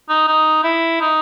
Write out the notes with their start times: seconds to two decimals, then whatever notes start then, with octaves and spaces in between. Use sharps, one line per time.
0.09 D#4
0.28 D#4
0.64 E4
1.01 D#4